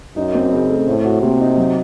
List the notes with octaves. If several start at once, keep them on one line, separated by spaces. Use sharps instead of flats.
F#2 D#4
C4
C#3
A3
A2 C5
F#4
C3 A#3
D#4
F#3